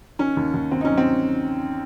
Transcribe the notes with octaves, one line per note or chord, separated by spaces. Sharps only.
D#3 C#4
D#2
D#2
D#2 C4
D#4
F#3 C#4
C4